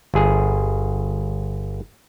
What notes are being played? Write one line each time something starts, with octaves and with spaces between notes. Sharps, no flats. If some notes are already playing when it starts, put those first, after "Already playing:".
G1 G#4